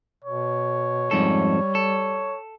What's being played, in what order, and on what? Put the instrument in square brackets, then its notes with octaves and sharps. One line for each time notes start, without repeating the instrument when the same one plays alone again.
[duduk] B2 [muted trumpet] C#5
[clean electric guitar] F2 G#2 A4 [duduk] G3
[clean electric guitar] A4